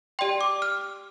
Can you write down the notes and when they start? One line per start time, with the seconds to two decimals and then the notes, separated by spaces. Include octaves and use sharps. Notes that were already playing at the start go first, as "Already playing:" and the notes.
0.19 G4 D5 G5 C6
0.41 D6
0.62 F6